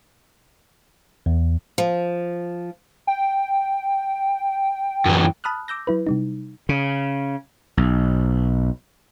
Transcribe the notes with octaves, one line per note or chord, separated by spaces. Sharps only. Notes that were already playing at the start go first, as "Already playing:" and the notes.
E2
F3
G5
F#2 E3
A5 B5 D#6 F6 F#6
D6 E6 G6 A#6
F#3 E4 B4
C3 G3 D#4
C#3
B1